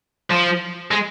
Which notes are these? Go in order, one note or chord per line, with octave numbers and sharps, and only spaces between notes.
F3
G#3